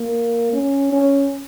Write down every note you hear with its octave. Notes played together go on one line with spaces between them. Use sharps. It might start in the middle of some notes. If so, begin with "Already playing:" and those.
Already playing: A#3
C#4
C#4